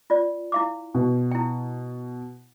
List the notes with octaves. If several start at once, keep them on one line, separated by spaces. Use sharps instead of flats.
F4 D5
E4 F5 D6
B2
E4 G5